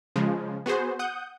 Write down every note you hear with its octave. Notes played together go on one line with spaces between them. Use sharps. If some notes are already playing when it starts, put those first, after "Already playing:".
C#3 F3 G#3
B3 F#4 G#4 C5
F#5 D#6 G6